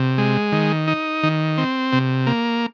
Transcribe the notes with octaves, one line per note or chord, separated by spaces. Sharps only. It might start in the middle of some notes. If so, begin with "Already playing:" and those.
Already playing: C3
G#3
D#3
D#4
D#3
C4
C3
A#3